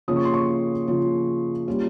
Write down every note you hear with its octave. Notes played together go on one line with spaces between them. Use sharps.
C#3 F3 A#3 C#4 F4 D#6
C#6
C6
C#6
C#3 F3 A#3 C#4 F4
G3 A#3 C#4 F4